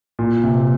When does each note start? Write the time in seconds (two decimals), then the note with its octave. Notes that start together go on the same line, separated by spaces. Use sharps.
0.19 A#2
0.43 C3